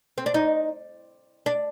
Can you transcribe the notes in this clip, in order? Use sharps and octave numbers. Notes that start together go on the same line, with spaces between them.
C4
D4
D#4
D4